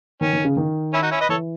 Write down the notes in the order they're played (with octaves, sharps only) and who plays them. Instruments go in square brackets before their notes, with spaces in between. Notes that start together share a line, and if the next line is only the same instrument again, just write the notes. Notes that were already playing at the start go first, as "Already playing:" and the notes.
[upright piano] D#3 [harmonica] C#4
[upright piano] D#3
C#3
D#3
[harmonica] C#4 E4
D#4 F#4
C#4 E4
B4 D#5
[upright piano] E3 [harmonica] A4 C#5